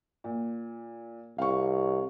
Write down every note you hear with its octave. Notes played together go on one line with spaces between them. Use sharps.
A#2
C2 F5 C#6